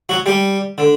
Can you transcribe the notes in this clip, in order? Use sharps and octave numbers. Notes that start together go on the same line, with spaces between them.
F#3 F#4
G3 G4
D3